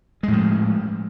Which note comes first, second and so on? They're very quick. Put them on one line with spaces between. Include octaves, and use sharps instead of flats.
G#3 A2 F3